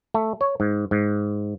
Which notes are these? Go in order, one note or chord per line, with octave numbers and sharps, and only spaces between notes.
A3
C#5
G#2
G#2